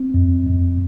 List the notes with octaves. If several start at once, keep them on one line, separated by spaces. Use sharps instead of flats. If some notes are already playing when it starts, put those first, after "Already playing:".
Already playing: C4
F2
F2